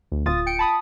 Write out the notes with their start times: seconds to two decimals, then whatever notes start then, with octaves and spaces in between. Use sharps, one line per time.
0.12 D2
0.26 D1 F4 D#6 A6
0.46 G5 C#7 D7
0.59 A5 B5 D#6